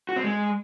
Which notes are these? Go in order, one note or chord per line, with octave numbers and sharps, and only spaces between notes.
F#4
C4
G#3